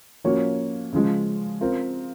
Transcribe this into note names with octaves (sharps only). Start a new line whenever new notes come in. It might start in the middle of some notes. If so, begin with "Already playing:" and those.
F3 A#3 C#4 F#4 C#5
C#3 F3 G#3
C4 F4 A#4